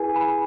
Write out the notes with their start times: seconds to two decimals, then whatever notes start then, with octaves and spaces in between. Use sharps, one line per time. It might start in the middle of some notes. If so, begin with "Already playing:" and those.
Already playing: E4 G#4 B4 G#5
0.16 B5